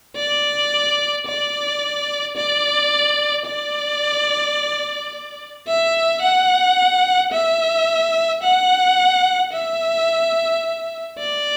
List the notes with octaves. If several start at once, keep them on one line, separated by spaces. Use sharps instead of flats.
D5
D5
D5
D5
E5
F#5
E5
F#5
E5
D5